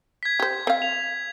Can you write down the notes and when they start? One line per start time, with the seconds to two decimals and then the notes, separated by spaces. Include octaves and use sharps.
0.23 G#6 B6
0.40 G4 C5
0.67 C4 F5
0.82 F7